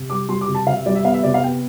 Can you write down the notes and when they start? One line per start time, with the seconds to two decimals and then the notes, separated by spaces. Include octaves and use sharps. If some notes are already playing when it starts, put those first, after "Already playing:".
Already playing: C3
0.10 G3 D6
0.29 G3 C6
0.41 D6
0.48 C3
0.54 A5
0.67 C3 F5
0.77 E5
0.86 G3 D5
0.95 E5
1.05 B3 F5
1.14 E5
1.24 C3 D5
1.34 F5
1.44 B3 G5